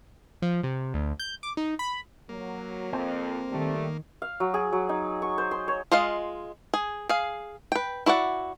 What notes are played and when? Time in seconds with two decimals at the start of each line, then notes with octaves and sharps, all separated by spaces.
0.42 F3
0.63 C3
0.94 D2
1.19 G6
1.43 D6
1.57 D#4
1.79 B5
2.29 F#3 A#3
2.93 F2 C4
3.49 D#3 G3 A3
4.22 F5
4.40 F#3
4.54 G#4
4.72 F#3
4.89 D#4
5.22 C#6
5.38 C5
5.51 C6
5.68 C#5
5.92 G#3 F4 D#5 F5
6.74 G#4
7.09 G#4 F5
7.72 B4 G5
8.06 E4 F#4 D5 F#5